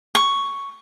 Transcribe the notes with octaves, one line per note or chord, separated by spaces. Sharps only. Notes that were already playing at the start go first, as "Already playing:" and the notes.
C#6